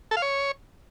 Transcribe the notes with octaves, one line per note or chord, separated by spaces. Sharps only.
A4
F5
C#5